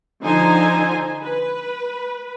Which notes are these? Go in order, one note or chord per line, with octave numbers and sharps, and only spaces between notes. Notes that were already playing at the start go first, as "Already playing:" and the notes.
D3 F3 D#4 C5 G#5 A#5
B4